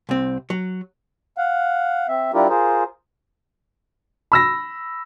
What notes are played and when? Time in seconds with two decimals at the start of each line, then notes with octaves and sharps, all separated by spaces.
0.09 C2 C4
0.50 F#3
1.38 F5 F#5
2.08 C4 E5
2.34 G3 D4 E4 F4 G4 A#4
2.49 F4 G#4 A#4 C5
4.32 B5 E6 A#6